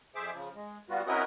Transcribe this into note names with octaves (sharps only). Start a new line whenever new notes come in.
F2 G#4 C5 E5 D6
C#3 F3
G#3
G3 B3 F4 F#4
C4 C#4 E4 F#4 A#4 D#5